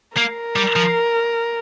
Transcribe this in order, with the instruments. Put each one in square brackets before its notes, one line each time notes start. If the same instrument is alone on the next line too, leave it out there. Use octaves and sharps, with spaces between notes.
[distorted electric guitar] A#3 [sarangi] A#4
[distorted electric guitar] G3
F3